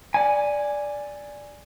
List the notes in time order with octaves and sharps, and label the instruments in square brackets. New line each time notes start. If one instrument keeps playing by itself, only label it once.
[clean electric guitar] D5 G#5